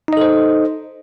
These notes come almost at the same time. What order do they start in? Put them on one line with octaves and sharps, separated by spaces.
D#4 D#5 A4 C5